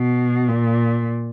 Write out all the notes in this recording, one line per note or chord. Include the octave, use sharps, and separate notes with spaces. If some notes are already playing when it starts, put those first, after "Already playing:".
Already playing: B2
A#2